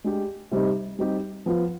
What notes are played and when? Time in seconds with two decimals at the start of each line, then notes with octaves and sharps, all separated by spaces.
0.04 G#3 D4 G4
0.51 C3 G3 C4 D#4
0.99 G3 C4 D#4 G4
1.46 F3 B3 F4